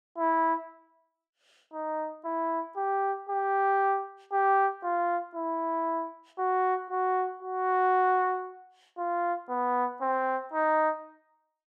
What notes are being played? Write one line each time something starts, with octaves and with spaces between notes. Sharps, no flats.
E4
D#4
E4
G4
G4
G4
F4
E4
F#4
F#4
F#4
F4
B3
C4
D#4